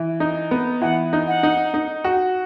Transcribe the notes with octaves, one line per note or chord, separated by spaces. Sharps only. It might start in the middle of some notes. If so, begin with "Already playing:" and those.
Already playing: E3
D#4
B3
E3 F#5
D#4
F#5
D#4
D#4
F#4